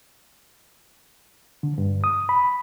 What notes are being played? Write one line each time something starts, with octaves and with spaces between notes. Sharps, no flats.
D3
G2
D#6
B5